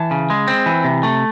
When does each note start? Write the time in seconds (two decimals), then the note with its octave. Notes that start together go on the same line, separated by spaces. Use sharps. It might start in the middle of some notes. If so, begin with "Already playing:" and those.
Already playing: E3 A5
0.11 C#3
0.30 G#3
0.48 C4
0.66 E3
0.84 C3
1.03 A3